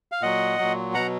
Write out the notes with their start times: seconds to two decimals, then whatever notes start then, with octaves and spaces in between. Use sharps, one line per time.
0.12 F5
0.21 A#2 F#3 D#5 F#5
0.59 A#2 F#3
0.94 B2 F#3 F#5 A#5